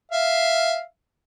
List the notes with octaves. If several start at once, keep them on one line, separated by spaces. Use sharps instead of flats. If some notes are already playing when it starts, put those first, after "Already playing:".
E5 F5